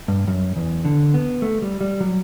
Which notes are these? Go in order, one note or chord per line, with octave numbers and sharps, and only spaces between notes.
G2
F#2
E2
D3
B3
A3
G3
G3
F#3